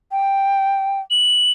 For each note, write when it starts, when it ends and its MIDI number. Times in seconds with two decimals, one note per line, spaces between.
0.12 1.00 79
1.11 1.52 102